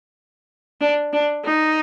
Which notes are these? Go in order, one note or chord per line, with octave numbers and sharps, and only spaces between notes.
D4
D4
D#4